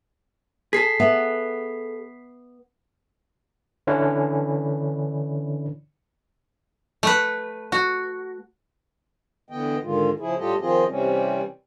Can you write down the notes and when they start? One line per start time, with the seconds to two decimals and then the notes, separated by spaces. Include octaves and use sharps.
0.73 G#4 A4 B6 C7
1.00 B3 E5
3.87 D3 E3 C#4 D4 E4
7.03 A3 B4
7.72 F#4
9.50 D3 E3 B3 D#5 G5
9.83 G#2 D3 D#3 G#3 F4
10.19 C#3 F3 E4 G#4
10.38 A2 G3 F4 G4 A4 D#5
10.61 D#3 F3 C4 F4 G#4 D#5
10.89 C3 E3 G3 C4 C#4